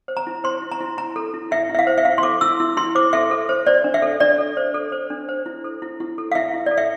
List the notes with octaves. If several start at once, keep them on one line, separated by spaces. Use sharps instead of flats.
C5
A#5
E4
C5 C6
E4
A#5
E4
E4 A#5
A4
E4
E4 E5
E4
E5
F5
C5
E5
E4 F5
C6
A4 D6
E4 E6
E4
E4 C6
C5 D6
A4 E5
A4
C5
C5 D5
D4
E5
A4
D4 D5
A4
C5
A4
C5
D4
C5
E4
A4
E4
E4
A4
F5
E4 E5
E4
A4 D5
E5